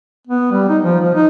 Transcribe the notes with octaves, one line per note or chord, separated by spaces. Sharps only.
B3
G3
D#4
F3
F3
D#4